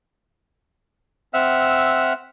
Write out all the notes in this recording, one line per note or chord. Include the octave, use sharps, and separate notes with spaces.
C4 E5 F#5 E6 F6